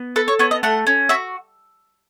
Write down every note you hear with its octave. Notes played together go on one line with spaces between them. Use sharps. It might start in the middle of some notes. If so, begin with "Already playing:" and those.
Already playing: B3
A4 B4
C#5
B3 C#5
D#5
A3 F#5
C#4
F#4 E5